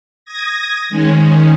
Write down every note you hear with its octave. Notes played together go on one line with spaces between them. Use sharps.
D#6 G#6 A#6
D#3 G#3 C#4